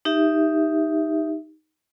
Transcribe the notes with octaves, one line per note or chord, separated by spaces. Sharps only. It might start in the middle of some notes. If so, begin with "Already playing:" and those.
D#4 G4 E5